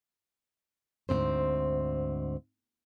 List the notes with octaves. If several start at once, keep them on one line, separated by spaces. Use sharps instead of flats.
D2 G#2 C3 C4 C5